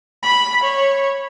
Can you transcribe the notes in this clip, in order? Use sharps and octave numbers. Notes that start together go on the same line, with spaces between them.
B5
C#5